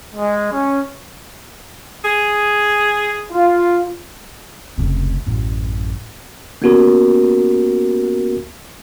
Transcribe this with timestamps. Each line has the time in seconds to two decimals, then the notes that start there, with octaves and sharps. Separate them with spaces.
0.15 G#3
0.52 C#4
2.04 G#4
3.32 F4
4.78 F1 C#2
5.27 A1 F#2
6.62 A#3 B3 C#4 F#4 G4 A#4